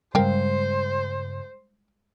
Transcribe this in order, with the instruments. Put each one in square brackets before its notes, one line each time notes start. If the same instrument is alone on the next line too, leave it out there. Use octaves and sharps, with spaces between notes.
[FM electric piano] G2 C#3 [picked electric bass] G3 G#3 [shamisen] A#4 F5 G5 [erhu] C5